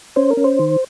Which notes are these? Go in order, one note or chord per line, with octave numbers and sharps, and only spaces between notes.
C#4 C5
A#4
C#4
C5
D#3